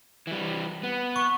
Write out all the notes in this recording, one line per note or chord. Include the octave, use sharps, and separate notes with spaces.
E3 G3
B3
C#6